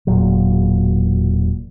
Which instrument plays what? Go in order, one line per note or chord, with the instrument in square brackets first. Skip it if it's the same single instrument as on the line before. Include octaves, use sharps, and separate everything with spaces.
[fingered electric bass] E1 A#2 F#3